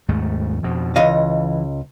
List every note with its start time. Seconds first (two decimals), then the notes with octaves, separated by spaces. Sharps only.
0.08 D#2 G#2 A3
0.63 F2 B2 F3
0.96 C#2 E3 D#5 F5